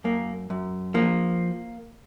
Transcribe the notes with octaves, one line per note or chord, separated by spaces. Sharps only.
F#2 A#3
F#2
F3 A#3